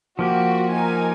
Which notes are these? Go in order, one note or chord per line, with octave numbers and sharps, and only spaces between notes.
F3 A#3 F#4 G4
D#4 A#4 G#5